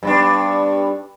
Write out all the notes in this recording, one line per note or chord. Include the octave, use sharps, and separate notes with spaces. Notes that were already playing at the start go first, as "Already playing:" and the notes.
G2 B3 D4